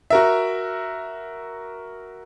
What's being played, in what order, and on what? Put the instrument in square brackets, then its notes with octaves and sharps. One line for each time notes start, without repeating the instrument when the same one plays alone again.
[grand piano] F#4 A#4 E5